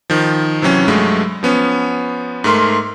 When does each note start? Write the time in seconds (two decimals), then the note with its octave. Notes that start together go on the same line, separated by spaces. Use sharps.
0.10 D#3 F3
0.62 C3 E3 F#3 C#4
0.88 G2 F#3 G#3 A3
1.43 F3 B3 C#4
2.44 G#2 A3 A#4 C6